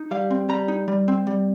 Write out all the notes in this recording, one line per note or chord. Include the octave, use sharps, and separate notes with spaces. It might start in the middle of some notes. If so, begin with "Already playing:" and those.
Already playing: D#4
G3 F5
C4
G3 A#5
D#4
G3
C4
G3